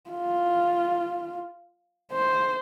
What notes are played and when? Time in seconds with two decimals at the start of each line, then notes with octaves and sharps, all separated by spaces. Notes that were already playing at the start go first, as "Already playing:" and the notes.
0.10 F4
2.12 C5